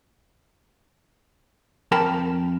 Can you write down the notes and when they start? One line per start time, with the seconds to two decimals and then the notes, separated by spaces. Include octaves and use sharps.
1.92 F2 A#4 G5 A5 B5